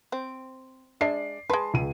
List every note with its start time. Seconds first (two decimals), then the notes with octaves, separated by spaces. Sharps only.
0.12 C4
1.01 G#3 D4 D5 E5 C7
1.50 G#3 B4 A5 C6
1.74 C#2 D#7